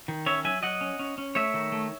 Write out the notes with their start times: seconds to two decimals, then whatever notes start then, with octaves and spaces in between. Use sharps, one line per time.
0.08 D#3
0.26 C#4 C#5 E5
0.44 F#3 E5 G#5
0.63 F#3 D#5 F#5
0.81 C#4
0.99 C#4
1.18 C#4
1.35 A3 C#5 E5
1.54 D#3
1.72 A3